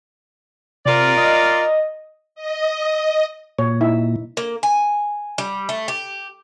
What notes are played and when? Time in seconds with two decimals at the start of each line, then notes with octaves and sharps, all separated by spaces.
0.86 C3 F4 A#4 D5
1.17 D#5
2.35 D#5
3.59 A#2 C#5
3.81 D#4 E4 E5
4.37 A#3
4.63 G#5
5.38 G3
5.69 A3
5.88 G4